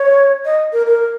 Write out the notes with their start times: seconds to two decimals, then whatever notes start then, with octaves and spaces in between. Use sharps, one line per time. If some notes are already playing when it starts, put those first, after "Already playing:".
Already playing: C#5
0.45 D#5
0.73 A#4
0.87 A#4